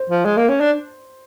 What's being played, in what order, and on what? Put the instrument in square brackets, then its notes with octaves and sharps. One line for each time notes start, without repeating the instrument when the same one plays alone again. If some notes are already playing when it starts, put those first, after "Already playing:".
Already playing: [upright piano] C5
[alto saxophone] F3
G#3
A#3
C#4
D4